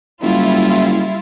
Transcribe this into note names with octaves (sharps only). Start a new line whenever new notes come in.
F#1 G3 E4 F4